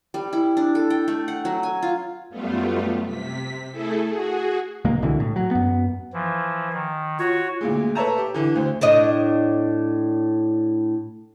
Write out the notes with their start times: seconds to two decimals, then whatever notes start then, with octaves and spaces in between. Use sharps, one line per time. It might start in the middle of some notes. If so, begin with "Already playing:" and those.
0.14 G3
0.33 E4
0.57 D4
0.75 A4
0.90 G5
1.08 A3
1.28 F#5
1.45 F#3
1.63 G#5
1.82 F4
2.30 F#2 G3 A3 B3 F4
3.05 C3 B6
3.71 A3 E4 G#4 A4
4.07 F#4 G#4
4.85 D1 C3 G#3 A#3
5.02 C2 B2 D3 E3
5.20 A2
5.36 F#3
5.51 F#2 B3
6.13 E3 F3
6.73 D#3
7.19 F4 F#4 C#5
7.61 D2 A#2 G#3
7.95 A4 B4 C#5 E5 A5 A#5
8.18 G4
8.34 D3 E3
8.55 D2 C5
8.81 A2 D4 D#5